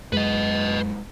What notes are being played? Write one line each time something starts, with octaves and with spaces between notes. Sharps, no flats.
F#2 G#3 B4 D#5